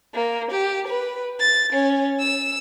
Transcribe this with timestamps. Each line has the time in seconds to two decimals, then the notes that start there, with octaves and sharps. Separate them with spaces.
0.14 A#3
0.51 G4
0.88 B4
1.41 A6
1.72 C#4
2.20 E6